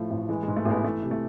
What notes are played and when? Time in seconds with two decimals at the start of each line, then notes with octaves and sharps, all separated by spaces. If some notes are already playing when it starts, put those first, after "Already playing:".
Already playing: A2 F3 A3
0.11 A1
0.29 E3 G#3
0.43 G#2 G#3
0.56 A3
0.65 A1 G#3 B3
0.84 E3 A3
1.02 C3
1.11 A3